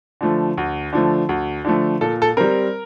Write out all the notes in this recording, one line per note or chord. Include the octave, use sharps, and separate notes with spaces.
D3 F3 A3
D2
D3 F3 A3
D2
D3 F3 A3
A#2 A4
A4
G3 C4 A#4